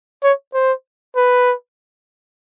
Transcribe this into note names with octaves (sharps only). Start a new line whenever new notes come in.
C#5
C5
B4